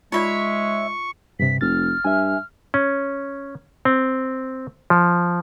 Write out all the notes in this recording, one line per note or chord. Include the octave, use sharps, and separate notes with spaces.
G#3 D#4 F4 C#5 D5 E5 C#6
G2 C3 B6
F1 F6 A6
G2 E5 G#5
C#4
C4
F3